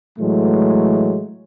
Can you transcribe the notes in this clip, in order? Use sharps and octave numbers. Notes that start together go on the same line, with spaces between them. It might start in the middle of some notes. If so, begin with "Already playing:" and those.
A2 E3 F#3 G#3 A3